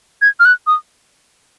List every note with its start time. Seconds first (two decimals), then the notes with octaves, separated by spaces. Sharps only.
0.22 G#6
0.40 F6
0.45 F#6
0.67 D#6